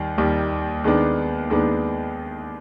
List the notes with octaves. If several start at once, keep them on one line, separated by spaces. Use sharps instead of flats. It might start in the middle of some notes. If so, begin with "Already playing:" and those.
Already playing: D#2 D#3 G3
D#2 D#3 G3
D#2 D#3 G#3 B3 D4
D#2 D#3 G#3 B3 D4